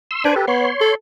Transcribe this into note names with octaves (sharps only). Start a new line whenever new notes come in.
C6 E6
D4 B4 C5 G#5
G4 A4 B4
B3 C#5 C6
A4